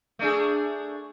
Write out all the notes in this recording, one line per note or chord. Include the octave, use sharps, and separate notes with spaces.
A3 D4 G#4